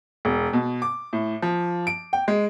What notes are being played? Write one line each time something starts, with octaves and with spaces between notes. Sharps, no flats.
E1
B2
D6
A2
F3
D7
G5
G#3